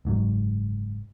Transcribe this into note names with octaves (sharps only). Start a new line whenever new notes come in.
F#1 G#2 C#3 F#3